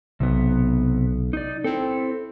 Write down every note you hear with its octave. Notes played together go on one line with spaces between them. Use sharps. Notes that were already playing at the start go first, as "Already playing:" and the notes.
B1 C3 B3
D#4 D5
C4 E4 A4